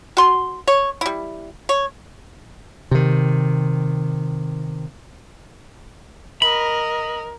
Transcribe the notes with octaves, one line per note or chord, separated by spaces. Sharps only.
F#4 C6
C#5
G3 E4
C#5
C3 D#3
A#4 D#5 B5